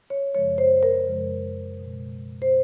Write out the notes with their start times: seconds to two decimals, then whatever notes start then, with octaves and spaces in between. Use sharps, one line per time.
0.10 C#5
0.34 F#2 C#3 F3 G#3 C#5
0.58 C5
0.83 A#4
1.07 F#2 C#3 F3 G#3
1.80 B2 G#3
2.42 C5